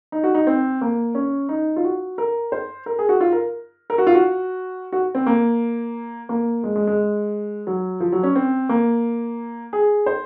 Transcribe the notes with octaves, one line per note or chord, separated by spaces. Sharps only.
D#4
F#4
D#4
C4
A#3
C#4
D#4
F4
F#4
A#4
C5
A#4
G#4
F#4
F4
A#4
A#4
F#4
F4
F#4
F#4
C4
A#3
A#3
G#3
G#3
G#3
F#3
F3
F#3
C#4
C4
A#3
G#4
C5